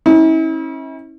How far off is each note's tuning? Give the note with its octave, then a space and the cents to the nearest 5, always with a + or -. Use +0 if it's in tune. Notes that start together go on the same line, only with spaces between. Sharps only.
C#4 -30 E4 -40